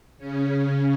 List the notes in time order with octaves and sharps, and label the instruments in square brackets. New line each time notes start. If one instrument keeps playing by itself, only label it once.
[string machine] C#3 C#4